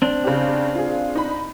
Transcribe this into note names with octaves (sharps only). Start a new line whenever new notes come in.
C4 D4
C#3 G4
F4 G#4
D#4 B5